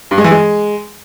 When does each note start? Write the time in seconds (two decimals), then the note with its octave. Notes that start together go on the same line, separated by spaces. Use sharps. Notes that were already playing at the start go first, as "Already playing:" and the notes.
0.11 G2
0.18 G#3
0.24 E3
0.31 G#3